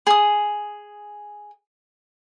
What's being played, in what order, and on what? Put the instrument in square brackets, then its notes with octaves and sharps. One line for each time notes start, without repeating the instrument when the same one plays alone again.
[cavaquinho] G#4 D#6